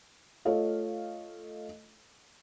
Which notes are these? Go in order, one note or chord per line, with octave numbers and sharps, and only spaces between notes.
A3 F4 A4 C#5 D#5 F5